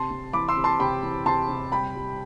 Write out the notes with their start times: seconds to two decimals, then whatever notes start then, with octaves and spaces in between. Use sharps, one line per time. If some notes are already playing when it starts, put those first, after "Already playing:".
Already playing: C3 A5 C6
0.10 C3
0.33 E3 B5 D6
0.48 C6 E6
0.57 C3
0.64 A5 C6
0.80 C3 G5 B5
1.03 E3
1.26 C3 A5 C6
1.49 C3
1.72 G3 G5 B5
1.95 G3